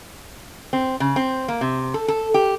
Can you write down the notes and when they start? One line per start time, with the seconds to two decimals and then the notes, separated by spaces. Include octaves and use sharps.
0.73 C4
1.00 C#3
1.16 C4
1.48 A#3
1.61 C3
1.94 A4
2.08 A4
2.34 G4